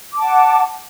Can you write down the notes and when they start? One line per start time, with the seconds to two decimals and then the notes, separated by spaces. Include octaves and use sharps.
0.14 D6
0.18 A5
0.23 F#5